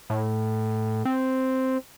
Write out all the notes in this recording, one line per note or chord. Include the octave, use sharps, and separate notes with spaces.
A2
C4